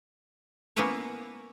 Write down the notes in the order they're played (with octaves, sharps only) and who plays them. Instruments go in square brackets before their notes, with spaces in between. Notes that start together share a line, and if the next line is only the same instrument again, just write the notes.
[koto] A#3 B3 C#4 E4 B4 C#5